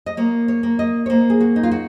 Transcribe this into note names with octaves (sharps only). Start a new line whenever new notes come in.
D#5
A#3 C#5
C#5
A#3
D#5
C#5
A#3 C5
G#4
F#4
D#4
F4
F#4